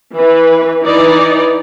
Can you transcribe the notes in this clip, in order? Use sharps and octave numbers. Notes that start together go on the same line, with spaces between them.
E3 B4
E3 D#4 D5